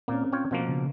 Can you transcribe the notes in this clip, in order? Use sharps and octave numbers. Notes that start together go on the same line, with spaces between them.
A#2 A#3 C4 C#4
F4 C#5 G5
B2 F3 A#3
C#3